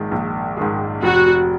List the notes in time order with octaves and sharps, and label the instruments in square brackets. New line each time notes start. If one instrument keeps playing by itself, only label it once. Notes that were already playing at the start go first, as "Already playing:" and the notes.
Already playing: [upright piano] A#1 G#2 D#3 G#3
A#1
G#2 D#3 G#3
[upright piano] F1 [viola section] F#4